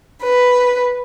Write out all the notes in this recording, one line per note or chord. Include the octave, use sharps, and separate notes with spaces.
B4